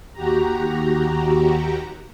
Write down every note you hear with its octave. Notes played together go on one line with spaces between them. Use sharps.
D#2 F#4 G4 A#5